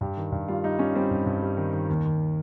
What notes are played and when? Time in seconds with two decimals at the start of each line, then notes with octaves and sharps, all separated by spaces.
0.01 G2 G4
0.17 D#3
0.32 G2
0.48 G3 F4
0.64 G3 D#4
0.79 G3 C#4
0.95 G3 C4
1.11 G2
1.26 G2
1.42 G3
1.57 D#3
1.73 D#3
1.89 D#2
2.05 D#2